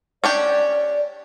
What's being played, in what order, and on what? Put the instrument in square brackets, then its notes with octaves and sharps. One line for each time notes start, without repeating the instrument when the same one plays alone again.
[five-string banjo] C#4 D4 G4 [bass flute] D5